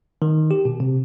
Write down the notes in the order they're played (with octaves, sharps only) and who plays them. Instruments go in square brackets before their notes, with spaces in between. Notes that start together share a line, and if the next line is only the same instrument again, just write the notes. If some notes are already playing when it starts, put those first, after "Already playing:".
[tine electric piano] D#3
G4
B2
C3